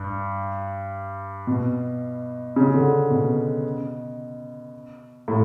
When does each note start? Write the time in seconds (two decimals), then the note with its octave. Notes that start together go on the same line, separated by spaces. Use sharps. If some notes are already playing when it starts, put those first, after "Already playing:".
Already playing: G2
1.47 B2
2.56 C#3
2.74 D3
3.10 B2
5.28 A2